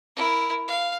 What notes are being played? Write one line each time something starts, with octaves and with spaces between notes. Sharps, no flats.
E4 A#4
F5